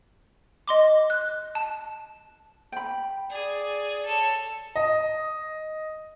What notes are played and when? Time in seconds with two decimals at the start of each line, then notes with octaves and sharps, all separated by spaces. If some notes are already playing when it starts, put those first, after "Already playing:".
0.68 D#5 C6 D6
1.10 F#6
1.55 A5
2.72 G5 B5
3.30 G#4 D5
4.05 A4 C#5
4.76 D#5